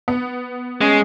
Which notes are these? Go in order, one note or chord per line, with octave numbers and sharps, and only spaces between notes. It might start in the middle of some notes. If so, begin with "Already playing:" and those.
B3
G#3 C#4